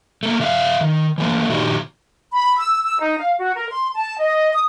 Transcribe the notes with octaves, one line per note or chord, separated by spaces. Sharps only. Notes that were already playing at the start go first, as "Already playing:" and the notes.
A3 A#3
C#3 E5 F5
D#3
E3 A3 A#3
A#2 D#3 D#4 F#4 G4
B5
E6
E6
D#4
F5
F#4
A#4
C6
A5
D#5
D#6